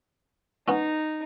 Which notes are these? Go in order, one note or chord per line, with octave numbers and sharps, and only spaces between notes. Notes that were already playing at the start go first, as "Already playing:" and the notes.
B3 C#4 D#4